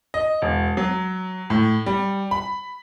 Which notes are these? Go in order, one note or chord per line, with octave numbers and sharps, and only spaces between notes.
D#5
E1
F#3
A2
G3
B5